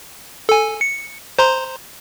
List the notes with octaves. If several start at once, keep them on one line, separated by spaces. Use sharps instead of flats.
A4 G#5
C#7
C5 A#5 C6